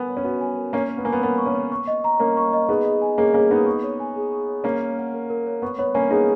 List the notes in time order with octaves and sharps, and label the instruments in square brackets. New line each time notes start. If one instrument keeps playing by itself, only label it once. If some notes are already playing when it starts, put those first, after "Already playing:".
Already playing: [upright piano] B3 [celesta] A#4 G#5
[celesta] C#5
[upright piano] C#4
[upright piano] B3 [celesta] F#4
[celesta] G#5
A#4
[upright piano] A#3 C#4 [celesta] C#6
[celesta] C#5
[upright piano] B3
[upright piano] A#3 [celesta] G#5
[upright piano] B3
[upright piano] B3 [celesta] A#4
[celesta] C#6
[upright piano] A#3 C#4
[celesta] C#5
C#6
D#5
A#5
[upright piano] A#3 C#4 [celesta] A#4
[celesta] C#6
D#5
[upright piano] B3 D#4 [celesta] G#4
[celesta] D#5
G#5
[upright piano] A#3 C#4 [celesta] G#4
[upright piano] A#3 C#4 [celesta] G#4
[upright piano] B3 D#4 [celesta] D#5
[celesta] C#6
C#5
G#5
G#4
C#6
C#5
[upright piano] A#3 C#4 [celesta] A#4
[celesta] C#5
F#5
A#4
A#4
C#5
[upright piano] B3 [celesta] C#6
[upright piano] B3 [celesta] C#5
[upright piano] A#3 C#4 [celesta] G#5
[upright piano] B3 D#4 [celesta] G#4